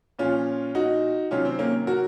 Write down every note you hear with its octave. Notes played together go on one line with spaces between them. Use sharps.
A#2 F3 C#4 F4
D#4 F#4
C3 D#3 F#3 C#4 F4
C4
A#3 C#4
F#4 A#4